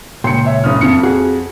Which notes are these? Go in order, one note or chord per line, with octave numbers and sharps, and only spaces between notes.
C#2 A#2 G5 C6 C#7
C#5 E5
F#1 D#6 F6
F2 F3 C#7
F#4 G#4